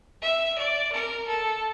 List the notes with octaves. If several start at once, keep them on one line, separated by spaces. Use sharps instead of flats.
E5
D5
A#4
A4